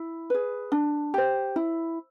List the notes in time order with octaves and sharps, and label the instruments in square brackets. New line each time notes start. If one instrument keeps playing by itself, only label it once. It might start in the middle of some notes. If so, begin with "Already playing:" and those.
Already playing: [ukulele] E4
G#4 B4
D4
G4 C5
E4